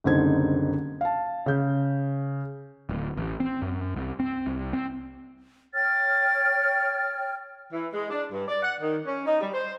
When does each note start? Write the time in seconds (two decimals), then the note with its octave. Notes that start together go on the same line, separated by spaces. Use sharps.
0.04 F#1 C2 D3 D#4 C5 G#6
1.01 F5 A5
1.46 C#3 G6
2.89 D1
3.17 A1
3.40 C4
3.62 F#2
3.96 C2
4.20 C4
4.47 C2
4.73 C4
5.74 C#5 G5 F6 A6
7.72 E3
7.93 G#3
8.10 D4
8.32 G2
8.48 D5
8.62 F#5
8.80 D#3
9.06 C#4
9.26 D#4
9.40 G3
9.54 C5